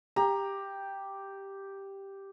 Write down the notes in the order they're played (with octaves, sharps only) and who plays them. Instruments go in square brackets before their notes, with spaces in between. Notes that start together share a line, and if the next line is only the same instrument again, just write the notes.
[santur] G4 [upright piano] A#5